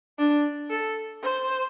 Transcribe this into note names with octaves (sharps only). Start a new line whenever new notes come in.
D4
A4
C5